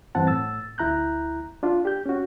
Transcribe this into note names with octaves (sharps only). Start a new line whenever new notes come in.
G2 E3 C4 F#5 A5
A2 E6 A6
D2 E4 A#5 F#6 G6
D4 F4
G4 G6
C#4 F#4